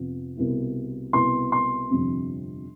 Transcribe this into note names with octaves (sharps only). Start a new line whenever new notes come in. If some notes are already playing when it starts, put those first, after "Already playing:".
Already playing: F1 F2 C3 F3 B3
C2 B2 B3 E4
C2 B2 B3 E4 C6
C6
G1 F2 C3